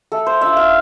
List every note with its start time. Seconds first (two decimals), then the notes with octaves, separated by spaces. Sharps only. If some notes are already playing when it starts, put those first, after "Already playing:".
0.12 A3 A4
0.27 C5
0.41 D4 F4 E5
0.57 F5